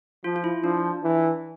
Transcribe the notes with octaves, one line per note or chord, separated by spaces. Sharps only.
F3 F4
F4
E4
F3 D4
E3